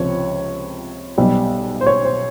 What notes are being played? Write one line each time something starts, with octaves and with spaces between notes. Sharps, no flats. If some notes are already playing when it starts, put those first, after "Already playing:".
Already playing: C#2 C3 F3 C#5
B1 B2 G3
C5
C#5
C5